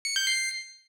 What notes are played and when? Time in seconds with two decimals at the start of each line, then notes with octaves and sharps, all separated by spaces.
0.05 C#7
0.16 G6
0.27 C7